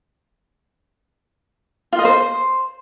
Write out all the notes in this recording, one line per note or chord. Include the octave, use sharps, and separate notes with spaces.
F4
D#5
C5